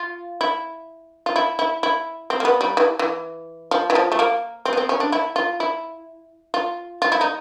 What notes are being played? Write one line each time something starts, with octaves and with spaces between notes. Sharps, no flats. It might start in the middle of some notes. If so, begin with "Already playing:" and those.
Already playing: F4
E4
F4
E4
E4
E4
C4
A#3
B3
G3
E3
E3
F3
E3
F3
A3
A#3
C4
B3
C4
C#4
D4
E4
F4
E4
F4
F4
E4
D#4